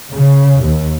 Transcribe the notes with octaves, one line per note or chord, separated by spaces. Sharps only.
C#3
D#2